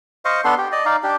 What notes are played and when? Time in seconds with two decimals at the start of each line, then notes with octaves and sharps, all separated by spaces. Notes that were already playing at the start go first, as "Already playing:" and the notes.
0.25 C5 D#5 F5 C#6
0.44 B3 D4 A4 C6
0.58 G4
0.72 D5 D#5
0.86 D#4 D5 F5
1.03 D4 G4